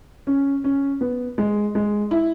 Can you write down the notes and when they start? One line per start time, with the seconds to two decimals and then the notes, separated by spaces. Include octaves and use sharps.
0.27 C#4
0.64 C#4
1.01 B3
1.38 G#3
1.75 G#3
2.11 E4